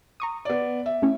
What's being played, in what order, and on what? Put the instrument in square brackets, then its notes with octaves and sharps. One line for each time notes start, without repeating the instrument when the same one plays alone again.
[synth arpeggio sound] A#5 C#6 D#6
[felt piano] B3 D5
E5
[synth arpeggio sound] A3 C#4 E4